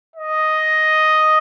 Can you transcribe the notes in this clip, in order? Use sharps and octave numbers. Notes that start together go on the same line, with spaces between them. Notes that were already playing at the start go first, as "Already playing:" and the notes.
D#5